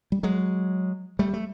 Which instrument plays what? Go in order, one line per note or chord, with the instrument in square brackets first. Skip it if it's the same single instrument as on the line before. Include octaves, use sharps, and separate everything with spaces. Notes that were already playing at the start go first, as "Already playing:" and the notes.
[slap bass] G3
F#3 G#3
G3 A3
A3